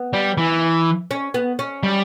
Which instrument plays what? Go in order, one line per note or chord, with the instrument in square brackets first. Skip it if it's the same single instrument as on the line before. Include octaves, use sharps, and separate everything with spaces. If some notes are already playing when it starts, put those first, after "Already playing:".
Already playing: [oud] B3
[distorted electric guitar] G3
E3
[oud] C#4
B3
C#4
[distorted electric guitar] G3